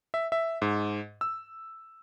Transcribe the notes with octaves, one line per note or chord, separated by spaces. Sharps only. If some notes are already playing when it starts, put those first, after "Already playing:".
E5
E5
G#2
E6